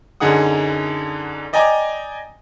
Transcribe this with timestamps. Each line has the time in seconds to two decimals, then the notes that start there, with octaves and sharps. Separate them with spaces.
0.20 F#2 D3 D#4 G#4 F#5 D#6
1.53 D5 D#5 G5 G#5 A#5 D6